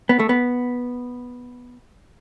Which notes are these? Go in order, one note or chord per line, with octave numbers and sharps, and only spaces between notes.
B3
A3
B3